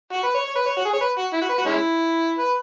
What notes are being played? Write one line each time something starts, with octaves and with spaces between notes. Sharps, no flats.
F#4
B4
C#5
C#5
B4
C#5
F#4
G#4
C#5
B4
F#4
E4
F#4
B4
F#4
G#3 C#4 E4
B4